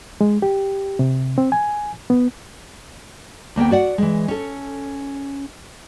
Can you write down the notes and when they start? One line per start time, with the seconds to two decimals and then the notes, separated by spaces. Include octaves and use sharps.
0.21 G#3
0.42 G4
0.99 C3
1.38 C4
1.52 G#5
2.10 B3
3.56 D2 A#3 B3 G5
3.71 F#4 D5 F#5
3.98 E3 G#3
4.28 C#4 A4